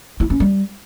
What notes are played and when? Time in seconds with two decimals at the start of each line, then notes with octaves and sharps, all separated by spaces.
0.20 E4
0.30 C#4
0.40 G3